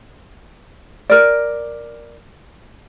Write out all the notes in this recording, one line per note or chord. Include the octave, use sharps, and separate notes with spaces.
A#4 D5